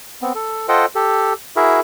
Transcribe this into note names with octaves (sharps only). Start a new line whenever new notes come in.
B3 C4
A4
F4 A4 C5 D#5 F#5 G5
G4 A4
E4 F#4 G#4 A#4 E5